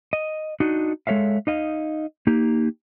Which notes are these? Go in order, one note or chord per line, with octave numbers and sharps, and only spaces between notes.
D#5
D4 D#4 F#4 D#5
G#3 A4 C#5 E5 F5
D#4 D#5 F5
A#3 D#4 G4